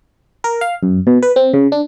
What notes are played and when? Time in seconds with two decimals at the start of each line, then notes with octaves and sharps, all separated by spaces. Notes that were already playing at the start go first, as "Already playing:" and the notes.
0.44 A#4
0.61 F5
0.83 F#2
1.07 B2
1.22 B4
1.36 C4
1.54 C#3
1.72 D4